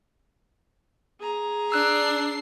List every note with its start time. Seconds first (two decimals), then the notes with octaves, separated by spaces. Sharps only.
1.20 G#4 A#5
1.72 D4 E6 F#6 C7